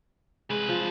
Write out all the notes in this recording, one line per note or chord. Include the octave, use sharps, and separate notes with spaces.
C2 G#3 B4
F3